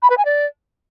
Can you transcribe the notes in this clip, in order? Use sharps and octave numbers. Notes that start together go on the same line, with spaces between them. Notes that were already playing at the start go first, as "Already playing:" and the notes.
B5
B4
G#5
D5